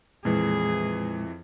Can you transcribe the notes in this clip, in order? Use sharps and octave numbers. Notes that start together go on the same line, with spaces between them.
F2 A#2 E3 G#3 G#4